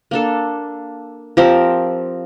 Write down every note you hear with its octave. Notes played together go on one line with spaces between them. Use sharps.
A#3 D4 A4
F3 C4 G4 A#4